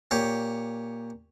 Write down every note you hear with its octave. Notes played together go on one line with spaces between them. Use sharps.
A#2 G4 C#5